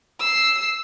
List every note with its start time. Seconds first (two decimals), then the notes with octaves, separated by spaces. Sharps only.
0.20 E6 C7